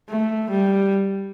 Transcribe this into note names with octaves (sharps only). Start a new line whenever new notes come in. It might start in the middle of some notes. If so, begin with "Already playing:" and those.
A3
G3